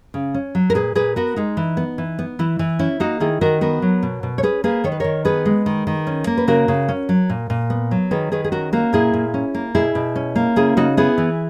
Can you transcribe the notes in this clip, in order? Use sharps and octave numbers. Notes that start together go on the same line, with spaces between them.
C#3
C#4
F#3
A#4
A#2 G#4 B4
A#2 G#4 B4
B3 F#4 A#4
G#3 D#4
E3
B3
E3
B3
E3 E4
E3
C#4 E4
A#3 D#4 F#4
D#3 E4 G#4
D#3 F#4 A#4
B3 F#4 A#4
F#3
B2
B2
C#5
C#4 G#4 B4
A#3 G#4 B4
D#3 C#5
B4
D#3 A#4 C#5
B3 G#4 B4
G#3
D#3
D#3
C#4
A#3
B4
C#3 F#4 A#4
C#3
C#4
F#3
A#2
A#2
B3
F#3
D#3 G#4 B4
D#3 G#4 B4
G#4
C#4 F#4 A#4
A#3 F#4 A#4
A#2 E4 G#4
A#2
C#4
A#3
B2 E4 G#4
B2
C#4
A#3
C#3 E4 G#4
C#3 D#4 F#4
B3 E4 G#4
E3